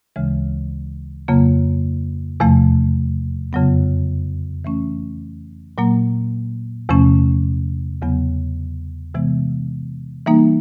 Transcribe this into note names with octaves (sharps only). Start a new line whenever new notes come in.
D2 C#3 E3 G#3
F2 C#3 F#3 A#3
E2 C3 F3 A3
F2 C#3 F#3 B3
E3 A3 C#4
A#2 F#3 A#3
E2 C3 F3 A3 C#4
E2 C#3 F#3 B3
C3 E3 G#3 B3
E3 G3 A#3 D#4